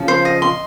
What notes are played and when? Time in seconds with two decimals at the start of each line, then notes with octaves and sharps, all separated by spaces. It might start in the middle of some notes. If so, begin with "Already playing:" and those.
Already playing: C#3 F3
0.08 C5
0.25 D#5
0.42 C6